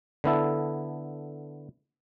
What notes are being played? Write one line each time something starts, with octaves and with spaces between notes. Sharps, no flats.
D3 B3 E4 A4